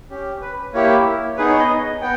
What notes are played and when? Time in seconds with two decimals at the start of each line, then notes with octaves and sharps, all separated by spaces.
0.10 C#4 G4
0.42 B4
0.73 A#3 E4 G4 C#5
1.37 B3 D#4 G#4 B4
1.49 C#5
1.59 D#5
2.02 B3 G5